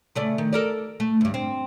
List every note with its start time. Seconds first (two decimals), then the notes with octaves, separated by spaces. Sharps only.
0.15 C#3 A3 D5
0.38 D#3
0.53 A4 A#4 D5
1.00 A3
1.21 D2 G2
1.34 C4